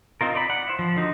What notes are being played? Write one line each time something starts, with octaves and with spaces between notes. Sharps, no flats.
C4 D#4 F4 A#4
D#4 D5 B5
F#5
E4 C5
F3
D3 D#4 F#4